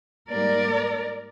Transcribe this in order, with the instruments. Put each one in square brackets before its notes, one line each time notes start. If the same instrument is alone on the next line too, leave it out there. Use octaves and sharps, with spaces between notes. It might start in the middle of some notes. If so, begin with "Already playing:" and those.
[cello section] G#2 G3 A#3 A#4 D5